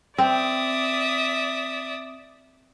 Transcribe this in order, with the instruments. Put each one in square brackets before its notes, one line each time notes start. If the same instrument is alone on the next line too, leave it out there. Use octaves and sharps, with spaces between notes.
[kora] C4 [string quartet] D5 E5 D#6